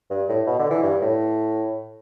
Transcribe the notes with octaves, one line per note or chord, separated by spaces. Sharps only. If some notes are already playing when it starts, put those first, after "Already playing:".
G2
A2
B2
D3
E3
G2
A2